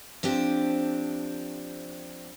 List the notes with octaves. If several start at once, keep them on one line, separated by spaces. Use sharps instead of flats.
F3 C4 D4 G4